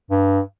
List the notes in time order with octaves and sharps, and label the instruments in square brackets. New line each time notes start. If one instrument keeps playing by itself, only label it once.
[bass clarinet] G2